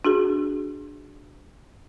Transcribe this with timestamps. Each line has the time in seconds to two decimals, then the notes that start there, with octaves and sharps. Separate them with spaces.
0.05 D4 F#4 G#4